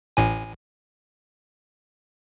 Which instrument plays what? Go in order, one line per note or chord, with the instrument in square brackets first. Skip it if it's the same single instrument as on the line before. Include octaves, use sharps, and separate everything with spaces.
[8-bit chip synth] A1 A2 G#5